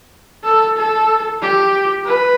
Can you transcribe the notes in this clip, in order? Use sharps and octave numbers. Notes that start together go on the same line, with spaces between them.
A4
A4
G4
B4